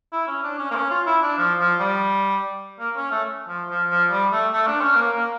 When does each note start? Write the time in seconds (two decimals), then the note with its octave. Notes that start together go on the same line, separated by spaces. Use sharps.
0.12 E4
0.28 C#4
0.43 D4
0.59 C#4
0.71 A#3
0.75 C#4
0.91 F4
1.07 E4
1.22 D4
1.38 F3
1.59 F3
1.80 G3
2.79 A#3
2.96 C#4
3.11 A3
3.48 F3
3.69 F3
3.90 F3
4.11 G3
4.32 A3
4.53 A3
4.67 D4
4.81 C#4
4.95 A#3
5.16 A#3